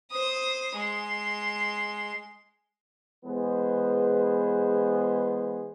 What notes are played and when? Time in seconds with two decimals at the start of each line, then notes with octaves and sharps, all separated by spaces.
0.11 C5 D#6
0.76 G#3 C6
3.25 E3 G#3 B3 G#4 B4 C5